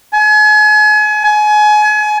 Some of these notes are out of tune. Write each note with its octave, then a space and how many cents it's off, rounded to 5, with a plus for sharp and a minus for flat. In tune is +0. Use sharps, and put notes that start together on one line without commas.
G#5 +35
G#5 +30